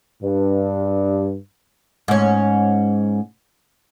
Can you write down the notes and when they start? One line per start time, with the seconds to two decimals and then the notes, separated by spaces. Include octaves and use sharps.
0.23 G2
2.08 G#2 C#4